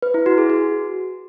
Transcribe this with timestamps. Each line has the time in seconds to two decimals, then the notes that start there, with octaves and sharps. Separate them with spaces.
0.02 B4
0.14 E4
0.26 F#4
0.38 G#4
0.50 F#4